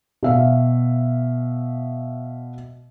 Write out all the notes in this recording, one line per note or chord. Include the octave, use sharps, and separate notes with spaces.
B2 E5 F5